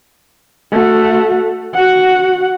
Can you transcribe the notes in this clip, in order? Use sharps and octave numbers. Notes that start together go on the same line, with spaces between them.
A3 F#4
F#4 F#5